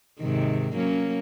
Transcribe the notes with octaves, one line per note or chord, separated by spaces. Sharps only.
G#2 C3 D#3
F#3 A#3 C#4